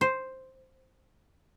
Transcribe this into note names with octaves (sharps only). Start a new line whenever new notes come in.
C5